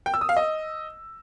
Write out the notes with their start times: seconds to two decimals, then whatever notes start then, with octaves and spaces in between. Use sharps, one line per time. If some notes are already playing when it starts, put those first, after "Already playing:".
0.06 G5
0.14 E6
0.21 D#6
0.29 F5
0.37 D#5